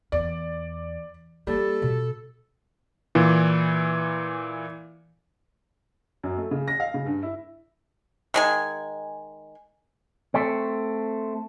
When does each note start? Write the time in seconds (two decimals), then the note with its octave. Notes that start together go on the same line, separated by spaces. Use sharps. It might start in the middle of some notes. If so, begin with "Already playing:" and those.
0.12 E2 D5
1.47 G3 A#3 A4
1.82 B2
3.15 A#2 E3
6.23 F#2
6.37 A3
6.51 C#3
6.68 A#6
6.80 F5
6.94 C#3
7.06 G2
7.23 E4
8.34 D#3 G#3 G#5
10.34 A3 C4